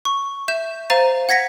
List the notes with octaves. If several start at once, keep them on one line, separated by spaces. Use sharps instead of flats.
C#6
E5 G6 E7
C5 F5 A#5 A6 D#7
F#5 G#6 A#6 B6 C#7